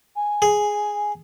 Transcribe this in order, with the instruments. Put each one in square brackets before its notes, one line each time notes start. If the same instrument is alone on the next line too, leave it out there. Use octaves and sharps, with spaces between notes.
[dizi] G#5
[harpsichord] G#4